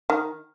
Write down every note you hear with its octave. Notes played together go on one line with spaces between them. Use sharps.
D#3